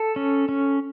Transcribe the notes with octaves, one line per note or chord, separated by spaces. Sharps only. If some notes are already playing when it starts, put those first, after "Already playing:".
Already playing: A4
C#4
C#4